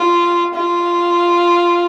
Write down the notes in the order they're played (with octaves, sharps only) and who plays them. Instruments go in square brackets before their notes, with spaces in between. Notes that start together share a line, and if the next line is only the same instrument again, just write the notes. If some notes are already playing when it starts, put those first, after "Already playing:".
Already playing: [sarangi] F4
F4